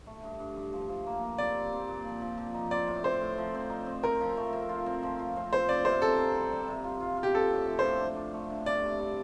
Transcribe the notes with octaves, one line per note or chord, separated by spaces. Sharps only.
A3
G2
G2
G2
F3
F3
A#3
A#3
C4 D5
G3
C4
A#2
F3
F3
F3
D#4
C4 D5
A2
C4 C5
A2
F3
C4
D#4
C4
C4 A#4
F3
A3
C4
F4
C4
F3
F4
C4
C4 C5
C4 D5
C3 C5
D#3 A4
D#3
G3
G3
C3
F4
F4
F4
G4
C4 A4
A2
F3
C5
A2
D4
D4
A3
D3
C3 D5
C3
G3